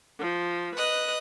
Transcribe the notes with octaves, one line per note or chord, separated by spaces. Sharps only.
F3
B4 D#5 F#6